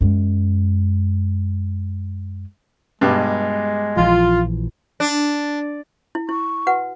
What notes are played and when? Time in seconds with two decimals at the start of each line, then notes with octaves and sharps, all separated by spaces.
0.01 F#2 G#3
3.01 G2 B2 G#3 G4
3.97 A#1 E3 F3 F4
5.00 D4
6.15 E4
6.29 E4 C#6
6.67 F#4 B4 F#5